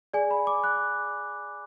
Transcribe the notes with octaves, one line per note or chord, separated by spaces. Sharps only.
G#4 D5 G#5
B5
D6
F#6